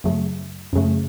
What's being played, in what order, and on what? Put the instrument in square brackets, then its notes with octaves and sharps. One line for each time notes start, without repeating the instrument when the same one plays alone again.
[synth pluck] F#2 C#3 F#3 A3
F#2 C#3 F#3 A3